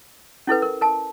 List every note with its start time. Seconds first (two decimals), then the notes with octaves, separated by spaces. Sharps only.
0.47 C#4 E4 A4 B4
0.62 A#4
0.81 A#4 A5